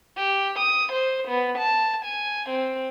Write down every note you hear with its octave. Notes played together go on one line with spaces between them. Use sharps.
G4
D#6
C5
B3
A5
G#5
C4